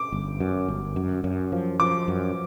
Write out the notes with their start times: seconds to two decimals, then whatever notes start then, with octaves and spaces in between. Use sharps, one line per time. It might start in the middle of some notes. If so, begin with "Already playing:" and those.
Already playing: D6
0.12 G1
0.40 F#2
0.68 G1
0.96 F#2
1.24 F#2
1.52 F3
1.80 F3 D6
2.08 F#2